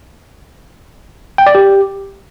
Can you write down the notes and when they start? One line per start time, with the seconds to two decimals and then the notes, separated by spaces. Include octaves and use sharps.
1.38 G5
1.47 D5
1.55 G4